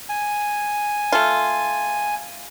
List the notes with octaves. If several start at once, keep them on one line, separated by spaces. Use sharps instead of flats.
G#5
A3 F4